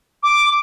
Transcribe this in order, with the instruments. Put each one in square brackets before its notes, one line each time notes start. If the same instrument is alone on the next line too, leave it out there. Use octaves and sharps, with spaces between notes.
[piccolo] D6